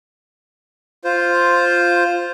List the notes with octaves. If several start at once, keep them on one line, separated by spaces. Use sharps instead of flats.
F4 C5